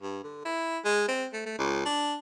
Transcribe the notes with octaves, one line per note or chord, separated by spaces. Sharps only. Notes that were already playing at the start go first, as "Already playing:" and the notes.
G2
D3
E4
G#3
C4
A3
A3
C#2
D4